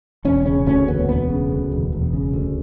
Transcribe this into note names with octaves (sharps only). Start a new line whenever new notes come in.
E1 C#4
C#3 C#4
D2 C#4
E1 B3
E1 B3
C#3
D2
E1
E1
C#3
D2